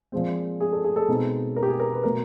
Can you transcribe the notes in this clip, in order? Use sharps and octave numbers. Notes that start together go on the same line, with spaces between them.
A#2 F3 G#3 C4
G#4
A4
G#4
A4
B2 G#3 C4 D#4
A#4
G4
G#4
A#4
B4
B2 F#3 A3 A#4